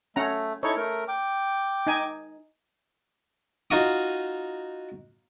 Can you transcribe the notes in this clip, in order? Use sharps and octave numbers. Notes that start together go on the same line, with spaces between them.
A3 C#4 F#5 A#5
D#4 E4 A4 C#5
A3 A#4
G5 D6
D#4 G#5
D#4 F4 F#4 D#6